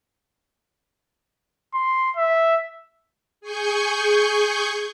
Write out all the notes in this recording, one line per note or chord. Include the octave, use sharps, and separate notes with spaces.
C6
E5
G#4 G#5 C#6 G6